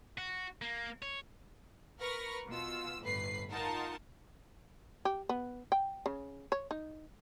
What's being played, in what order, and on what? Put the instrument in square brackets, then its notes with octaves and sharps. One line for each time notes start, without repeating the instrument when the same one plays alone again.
[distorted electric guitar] F#4
A#3
C#5
[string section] A#4 B4 C#6 F6 A#6
B2 F4 E6
G1 A2 B4 C7
D#4 F4 A#4 F#5 A5 C6
[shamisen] G4
B3
G5
C#3
C#5
D#4